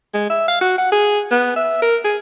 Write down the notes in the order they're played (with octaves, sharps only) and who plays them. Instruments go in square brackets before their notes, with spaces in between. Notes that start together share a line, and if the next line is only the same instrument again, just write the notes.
[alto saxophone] G#3
E5
F5
F#4
F#5
G#4
B3
E5
A#4
G#4